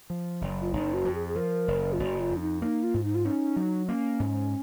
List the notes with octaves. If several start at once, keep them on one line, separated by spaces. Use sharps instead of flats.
F3
F#1
F4
F#1 D#4
F#4
F2
G#4
G#4
F3 A#4
F#1
F4
F#1 F#4
F4
F2
C#4
D#4
A#3 D#4
F4
G#2
D#4
F4
C#4 D#4
F#3
A#3 C#4
G#2